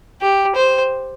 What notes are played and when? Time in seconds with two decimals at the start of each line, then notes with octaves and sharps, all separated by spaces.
0.21 G4
0.55 C5